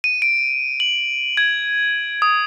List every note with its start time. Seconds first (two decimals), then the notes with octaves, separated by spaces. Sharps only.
0.04 D#7
0.22 D7
0.80 F#7
1.37 G#6
2.22 D#6